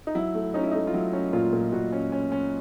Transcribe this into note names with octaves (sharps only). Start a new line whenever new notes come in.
D#4
F#3 E4
A3
C#4 D#4
E4
A3 D#4
F4
F#3 E4
C#4
A#2 F4
A#2
A#2 F#4
C#4
C#4
C#4